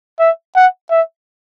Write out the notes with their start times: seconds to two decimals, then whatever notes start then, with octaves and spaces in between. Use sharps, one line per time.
0.19 E5
0.56 F#5
0.91 E5